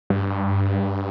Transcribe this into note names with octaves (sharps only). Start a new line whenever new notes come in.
G2